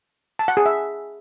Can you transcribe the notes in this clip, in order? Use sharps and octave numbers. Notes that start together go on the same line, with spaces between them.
A5
F#5
G#4
E5